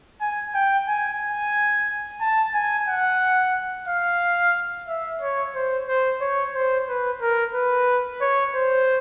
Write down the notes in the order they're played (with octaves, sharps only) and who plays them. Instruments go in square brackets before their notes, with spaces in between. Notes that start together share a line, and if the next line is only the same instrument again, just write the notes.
[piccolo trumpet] G#5
G5
G#5
G#5
A5
G#5
F#5
F5
E5
C#5
C5
C5
C#5
C5
B4
A#4
B4
C#5
C5